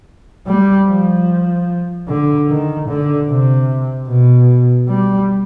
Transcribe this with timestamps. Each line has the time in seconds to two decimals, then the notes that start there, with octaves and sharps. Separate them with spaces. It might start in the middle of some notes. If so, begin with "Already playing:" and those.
0.47 G3
0.87 F3
2.08 D3
2.49 D#3
2.88 D3
3.29 C3
4.08 B2
4.89 G3